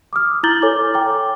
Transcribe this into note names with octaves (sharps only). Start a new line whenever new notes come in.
D6 D#6 F6
E4 A#5 G6 A6 F#7 G7
A4 C#5 G#5 D6
G5 A#5 D6